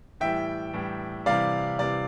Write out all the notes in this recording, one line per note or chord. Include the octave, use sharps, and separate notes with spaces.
A2 E3 G3 E5 G5
A2 E3 G3
C3 E3 G3 D5 F5
C3 E3 G3 D5